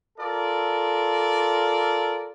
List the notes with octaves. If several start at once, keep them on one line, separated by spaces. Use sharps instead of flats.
F4 A4 A#4 D5